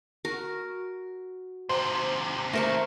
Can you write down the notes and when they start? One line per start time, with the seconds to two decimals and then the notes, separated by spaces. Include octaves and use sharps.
0.25 F#4 A#4
1.69 D#2 C3 C5
2.53 A3 A#4 C5 C#6